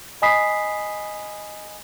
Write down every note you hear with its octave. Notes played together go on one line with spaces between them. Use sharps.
D#5 G#5 B5 D#6 B6 C7